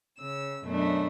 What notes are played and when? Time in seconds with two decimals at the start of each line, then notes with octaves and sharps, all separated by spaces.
0.17 C#3 E6
0.64 F#2 B2 A3 D4